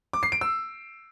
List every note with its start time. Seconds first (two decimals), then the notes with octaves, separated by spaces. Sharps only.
0.13 D6
0.23 C7
0.32 D7
0.41 E6